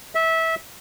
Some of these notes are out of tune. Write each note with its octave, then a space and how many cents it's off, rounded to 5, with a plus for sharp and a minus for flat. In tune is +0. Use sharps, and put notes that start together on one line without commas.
E5 -20